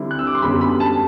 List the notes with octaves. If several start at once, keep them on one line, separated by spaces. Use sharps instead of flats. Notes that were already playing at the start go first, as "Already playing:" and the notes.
Already playing: D3 G3 C4 E4
F#6
E6
D6
C6
F#2 D3 G3 B3 B5
B5
A5